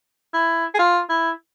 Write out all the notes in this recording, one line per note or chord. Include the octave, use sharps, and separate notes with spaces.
E4
G#4
F4
E4